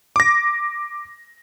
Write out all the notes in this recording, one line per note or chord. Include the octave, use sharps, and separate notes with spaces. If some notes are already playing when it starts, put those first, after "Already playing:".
D6 A#6